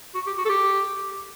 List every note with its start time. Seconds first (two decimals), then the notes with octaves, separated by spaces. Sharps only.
0.15 F#4
0.27 G4
0.38 F#4
0.45 A4
0.49 G4